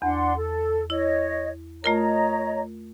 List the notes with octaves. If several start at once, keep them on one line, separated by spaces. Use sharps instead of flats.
E2 D4 F#5 C6
A4
E4 C#5 D#5
A3 F4 A#4 C#5 D#5 A#5